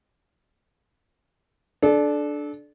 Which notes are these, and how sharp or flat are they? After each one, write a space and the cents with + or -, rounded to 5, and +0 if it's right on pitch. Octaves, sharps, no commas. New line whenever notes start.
D4 +5 A4 -30